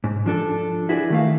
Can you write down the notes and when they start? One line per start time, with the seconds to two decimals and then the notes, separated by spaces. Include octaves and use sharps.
0.04 G#2
0.26 F3 D4 A4
0.89 E4 F#4 G#4 B4 C5 D5
1.10 D#3 A3 F5